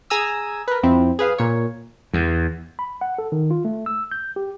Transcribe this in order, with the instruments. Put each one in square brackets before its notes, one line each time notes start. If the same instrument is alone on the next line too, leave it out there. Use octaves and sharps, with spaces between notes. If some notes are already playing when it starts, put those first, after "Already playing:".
[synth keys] G#4 G#5 A#5 D#6 E6
A#4 B4
F2 F3 C4 E4
G#4 B4 F5
A#2 C#5
[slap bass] E2
[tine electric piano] B5
F#5
A4
D#3
F4
A3
E6
G6
G4